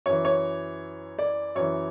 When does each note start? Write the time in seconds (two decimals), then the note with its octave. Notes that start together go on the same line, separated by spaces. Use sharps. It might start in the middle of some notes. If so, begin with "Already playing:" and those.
0.06 F#2 E3 C#5
0.25 C#5
1.19 D5
1.55 F#2 E3 C#5